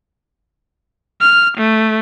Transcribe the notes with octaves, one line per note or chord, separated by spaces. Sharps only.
F6
A3